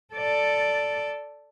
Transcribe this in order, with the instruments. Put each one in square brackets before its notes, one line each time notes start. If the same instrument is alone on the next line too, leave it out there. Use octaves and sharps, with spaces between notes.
[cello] A4 D5